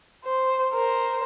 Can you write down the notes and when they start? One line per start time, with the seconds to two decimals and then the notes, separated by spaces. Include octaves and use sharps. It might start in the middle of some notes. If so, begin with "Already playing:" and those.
0.25 C5
0.73 A#4 C5